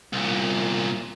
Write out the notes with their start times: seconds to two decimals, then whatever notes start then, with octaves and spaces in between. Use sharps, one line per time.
0.13 C2 A#2